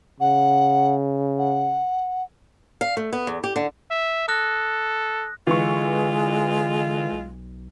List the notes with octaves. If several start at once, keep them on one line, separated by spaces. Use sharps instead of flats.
C#3 F#5
F#5
F5
A3
B3
E2
G4
D3
E5
A4 D#6 F#6 A#6
D3 E3 G#3 F4 C#6
B1